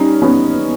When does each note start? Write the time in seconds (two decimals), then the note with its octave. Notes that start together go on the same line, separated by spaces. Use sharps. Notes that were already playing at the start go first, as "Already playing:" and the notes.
Already playing: G3 C#4 D#4
0.22 B3 C#4